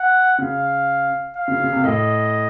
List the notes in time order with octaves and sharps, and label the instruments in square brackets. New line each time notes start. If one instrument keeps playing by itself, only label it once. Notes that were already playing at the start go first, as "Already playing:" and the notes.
Already playing: [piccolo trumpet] F#5
[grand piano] C#3 [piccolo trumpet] F5
[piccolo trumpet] F5
[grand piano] C#3
C#3
C3
[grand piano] A2 [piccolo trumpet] D#5